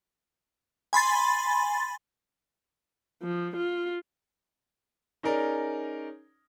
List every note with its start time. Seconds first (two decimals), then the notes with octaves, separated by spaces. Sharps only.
0.93 G#5 B5 C6 A6
3.22 F3
3.56 F4
5.23 C#4 D#4 G#4 A#4 D5